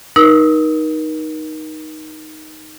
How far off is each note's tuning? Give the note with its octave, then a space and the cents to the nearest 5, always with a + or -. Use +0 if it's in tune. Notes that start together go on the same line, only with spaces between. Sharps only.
D#4 +0 A#4 +35 E6 -20